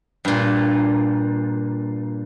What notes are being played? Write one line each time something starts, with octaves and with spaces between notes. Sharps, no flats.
G2 A#2